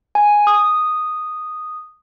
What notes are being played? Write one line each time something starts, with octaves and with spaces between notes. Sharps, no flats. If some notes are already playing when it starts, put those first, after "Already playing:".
G#5
D#6